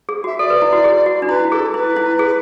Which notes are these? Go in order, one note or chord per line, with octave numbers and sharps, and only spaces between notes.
G#4
F#4
E5
A4 D5
B4
E4
F#4
G#4
F#4
D4
E4 B4
G#4 A4
E4 B4
E4
G#4